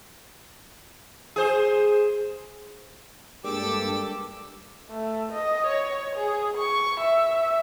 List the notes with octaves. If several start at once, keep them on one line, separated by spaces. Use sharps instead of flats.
G#4 C5
G2 G#3 A#3 D4 G4 A4 D6 E6
A3
D#5
C#5
G#4
C#6
E5